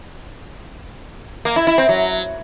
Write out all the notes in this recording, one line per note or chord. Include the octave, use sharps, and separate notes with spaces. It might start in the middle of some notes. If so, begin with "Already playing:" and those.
A#3
E4
E4
C4
F#3